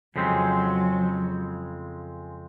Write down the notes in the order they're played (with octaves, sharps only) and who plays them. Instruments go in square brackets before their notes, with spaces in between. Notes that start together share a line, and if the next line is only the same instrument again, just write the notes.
[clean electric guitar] F2 C#3 G#3 C4 [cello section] F#3